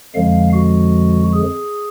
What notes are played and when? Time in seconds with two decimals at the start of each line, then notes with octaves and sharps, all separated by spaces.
0.14 F2 D3 F3 G#3 F5
0.53 F#4
1.33 G#4